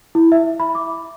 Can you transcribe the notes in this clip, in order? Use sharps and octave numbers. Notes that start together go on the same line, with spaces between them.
E4
E5
B5
D6